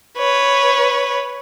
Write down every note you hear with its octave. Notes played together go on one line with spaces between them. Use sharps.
B4 C#5